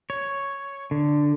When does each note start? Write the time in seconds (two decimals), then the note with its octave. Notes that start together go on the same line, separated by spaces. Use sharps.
0.10 C#5
0.91 D3